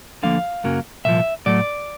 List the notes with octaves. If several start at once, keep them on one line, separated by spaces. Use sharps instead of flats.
D2 D3 F3 A#3 F5
F#2 C#3 F#3 A#3
C2 A#2 F3 E5
A2 F#3 A3 D5